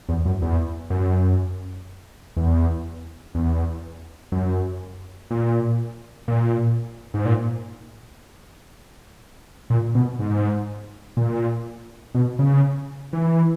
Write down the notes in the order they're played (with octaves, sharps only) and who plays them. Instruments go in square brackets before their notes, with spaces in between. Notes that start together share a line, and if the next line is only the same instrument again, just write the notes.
[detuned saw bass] E2
F#2
E2
F#2
E2
E2
F#2
A#2
A#2
G#2
A#2
A#2
B2
G#2
A#2
B2
C#3
E3